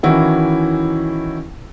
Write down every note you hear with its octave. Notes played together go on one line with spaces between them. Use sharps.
D#3 E3 C#4 E4 F#4